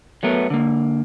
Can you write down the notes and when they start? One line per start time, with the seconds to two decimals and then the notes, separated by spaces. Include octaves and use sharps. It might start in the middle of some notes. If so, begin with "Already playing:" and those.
0.23 F#3 A3 B3 A#4
0.50 D3 A#3